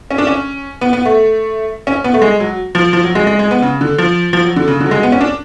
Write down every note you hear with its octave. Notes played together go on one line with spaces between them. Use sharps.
C#4
D4
C#4
B3
B3
A3
C#4
B3
A3
G#3
F#3
F3
F3
F#3
G#3
G#3
G#3
B3
C#3
D3
F3
F3
F#3
D3
C#3
D3
F#3
G#3
B3
C#4
D4